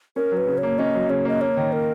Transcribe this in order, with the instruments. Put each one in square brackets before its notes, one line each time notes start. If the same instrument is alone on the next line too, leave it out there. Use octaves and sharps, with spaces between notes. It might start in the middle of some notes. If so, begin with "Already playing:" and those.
[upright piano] C#4 [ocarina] A#4
[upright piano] F#3
[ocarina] B4
[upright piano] C#3
[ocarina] C#5
[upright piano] A#3
[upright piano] C#4 [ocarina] D#5
[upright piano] F#3
[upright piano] C#3 [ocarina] C#5
[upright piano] A#3 [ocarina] D#5
[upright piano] A#3 [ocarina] C#5
[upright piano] D#3
[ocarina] A#4